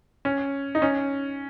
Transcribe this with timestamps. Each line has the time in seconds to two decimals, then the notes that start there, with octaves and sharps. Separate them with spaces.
0.25 C#4
0.75 D#4
0.82 C#4